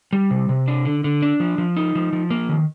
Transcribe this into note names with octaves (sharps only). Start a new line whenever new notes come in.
G3
C3
C3
D4
D3
D3
D4
F3
F3
D#4
F3
F3
A#3
D#3